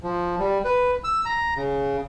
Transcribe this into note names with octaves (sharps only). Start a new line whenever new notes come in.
F3
G3
B4
E6
A#5
C#3